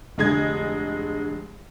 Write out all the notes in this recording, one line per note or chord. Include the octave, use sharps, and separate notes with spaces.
F1 D3 G#3 G#4 D#5 G#6